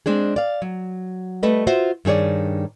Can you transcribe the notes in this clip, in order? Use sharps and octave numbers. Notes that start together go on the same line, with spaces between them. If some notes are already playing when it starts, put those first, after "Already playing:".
G#3 C4 D4 G#4
D5 F5
F#3
G3 A3 B4 D#5
F4 F#4 C5 E5
G2 D#3 G#4 C#5 D5